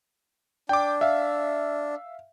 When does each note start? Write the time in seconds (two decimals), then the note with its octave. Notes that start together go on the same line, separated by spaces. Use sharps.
0.69 D4 G5 D6
1.01 E5 F5